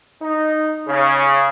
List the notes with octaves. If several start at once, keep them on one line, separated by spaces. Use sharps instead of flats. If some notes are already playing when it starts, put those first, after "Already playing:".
D#4
C#3